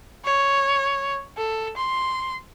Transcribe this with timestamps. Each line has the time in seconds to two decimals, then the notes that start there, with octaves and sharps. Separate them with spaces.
0.25 C#5
1.37 A4
1.77 C6